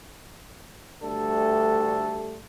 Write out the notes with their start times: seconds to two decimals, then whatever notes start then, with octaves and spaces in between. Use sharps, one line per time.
1.01 D2 G3 A3 D4 A4